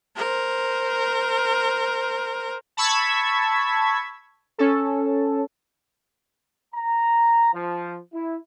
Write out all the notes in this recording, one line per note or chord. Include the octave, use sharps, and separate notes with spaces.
A#4 C5
A5 B5 C#6 E6 G#6 B6
C#4 A4
A#5
F3
E4